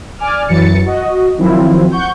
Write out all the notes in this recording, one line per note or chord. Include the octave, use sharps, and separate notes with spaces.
D5 G#5 D6 F6
F#2 E3 F#3 A6 C#7
F#4 D#5
D#3 F3 F#3 C4 E4 F4
F#5 C#6 G6